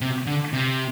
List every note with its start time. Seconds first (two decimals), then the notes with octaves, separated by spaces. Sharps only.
0.01 C3
0.26 D3
0.53 C3